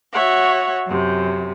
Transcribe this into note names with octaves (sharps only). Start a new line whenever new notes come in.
F#4 C#5 E5 F#5
F#2 C3